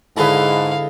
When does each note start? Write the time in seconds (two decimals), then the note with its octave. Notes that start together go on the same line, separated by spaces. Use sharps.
0.17 G#2 D3 G#3 E4 A4 B4 F5